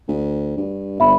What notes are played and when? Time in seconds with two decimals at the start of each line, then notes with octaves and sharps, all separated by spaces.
0.08 D2
0.57 G2
1.00 G1 E5 B5